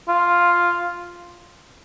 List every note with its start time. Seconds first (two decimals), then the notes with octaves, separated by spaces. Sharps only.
0.08 F4